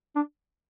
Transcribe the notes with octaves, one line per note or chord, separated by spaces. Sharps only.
D4